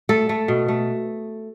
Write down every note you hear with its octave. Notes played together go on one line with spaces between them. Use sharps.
A3 A4
A3
B2
A3